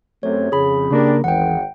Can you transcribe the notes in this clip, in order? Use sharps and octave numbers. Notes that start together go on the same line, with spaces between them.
F#2 C3 A3 C#5
F2 C#3 G#4 B5
C#3 A#3 D4 G4 A#4
G#1 E2 F#5 G5